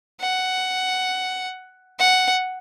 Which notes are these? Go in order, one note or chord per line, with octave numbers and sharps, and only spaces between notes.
F#5
F#5